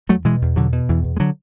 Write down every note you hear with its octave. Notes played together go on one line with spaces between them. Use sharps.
E2 F#3 A3
B2 E3 G#3
E2
B2 D3 F#3
B2
E2 E3
E2
G#3
D3 F#3